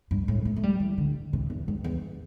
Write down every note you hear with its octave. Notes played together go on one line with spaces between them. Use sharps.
G2
A2
A3
A3
G3
E3
D3
C3
E2
G2
E2